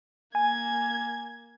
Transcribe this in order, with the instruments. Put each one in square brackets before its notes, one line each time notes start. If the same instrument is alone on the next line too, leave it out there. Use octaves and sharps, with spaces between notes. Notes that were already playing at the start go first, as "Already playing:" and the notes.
[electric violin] A#3 G#6 [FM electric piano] G#5